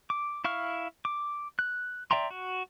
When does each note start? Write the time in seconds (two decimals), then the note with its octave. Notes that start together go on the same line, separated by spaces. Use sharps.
0.10 D6
0.44 E4 F5 C#6 F6
1.05 D6
1.59 F#6
2.11 D5 E5 G5 A#5 C6
2.30 F#4